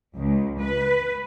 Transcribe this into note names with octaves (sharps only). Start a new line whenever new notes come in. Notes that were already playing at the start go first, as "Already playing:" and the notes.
C#2
B4